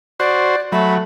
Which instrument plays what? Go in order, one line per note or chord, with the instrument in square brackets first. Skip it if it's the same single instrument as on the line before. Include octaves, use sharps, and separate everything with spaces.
[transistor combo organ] F#4 C5 [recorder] D5
[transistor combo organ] F#3 [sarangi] A3 [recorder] B5